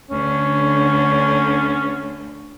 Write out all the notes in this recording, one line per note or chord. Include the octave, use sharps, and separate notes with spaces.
D2 D3 C#4